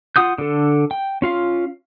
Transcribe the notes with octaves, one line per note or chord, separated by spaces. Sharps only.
F4 F#5 D#6 G6
D3 A4
G5
C#4 F4 F5